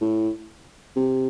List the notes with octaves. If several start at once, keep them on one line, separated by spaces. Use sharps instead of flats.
A2
C3